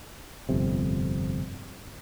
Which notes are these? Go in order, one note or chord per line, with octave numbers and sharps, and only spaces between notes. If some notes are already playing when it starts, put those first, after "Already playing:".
G1 F2 C3